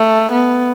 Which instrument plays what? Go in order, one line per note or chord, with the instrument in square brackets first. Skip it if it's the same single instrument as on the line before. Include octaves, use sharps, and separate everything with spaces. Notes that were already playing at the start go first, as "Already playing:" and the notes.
Already playing: [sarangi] A3
B3